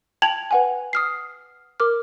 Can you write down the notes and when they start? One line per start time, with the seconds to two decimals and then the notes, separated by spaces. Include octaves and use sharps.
0.22 G5 A5 G#6 F7 F#7
0.51 B4 F#5 G#5
0.93 D#6 F6 C7
1.80 A#4 D6 F6